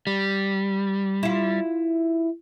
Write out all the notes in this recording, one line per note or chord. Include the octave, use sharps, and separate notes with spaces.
G3
E4 F4